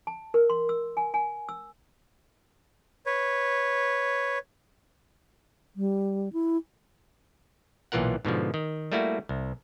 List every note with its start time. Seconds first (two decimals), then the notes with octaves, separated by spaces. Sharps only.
0.07 A5
0.34 A#4
0.50 C6
0.69 E6
0.97 G#5
1.14 G#5
1.49 E6
3.06 B4 C#5
5.76 G3
6.33 E4
7.92 B1 A#2 E3 F4 A#4 F#5
8.25 G#2 B2 D3 F3
8.54 D#3
8.92 G3 A3 A#3 E4 F#4
9.29 C2